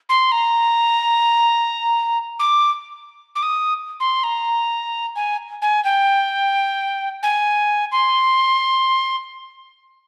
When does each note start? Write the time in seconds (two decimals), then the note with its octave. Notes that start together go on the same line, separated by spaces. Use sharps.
0.09 C6
0.32 A#5
2.39 D6
3.36 D6
3.43 D#6
4.00 C6
4.23 A#5
5.16 G#5
5.62 G#5
5.85 G5
7.23 G#5
7.92 C6